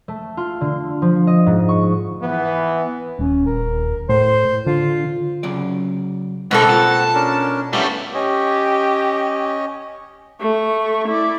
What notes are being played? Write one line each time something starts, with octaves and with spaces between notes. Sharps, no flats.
A3
F4
D3
F3
D#5
G#2
C#6
E3 B3
D#1 C#4
A#4
A2 C5
D3 F4
C#3 F#3 D5
G#2 B2 D3 A#3 C4 A4 F#5
F4 A5
C#4 D4 A#4
G3 A3 B3 C#4 E4 G4 E5 F5
C#4 G4 C#5 D#5
A3 C#6
E4 D5